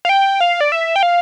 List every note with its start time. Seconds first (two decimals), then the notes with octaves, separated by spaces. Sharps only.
0.05 F5
0.09 G5
0.40 F5
0.61 D5
0.72 E5
0.96 G5
1.03 F5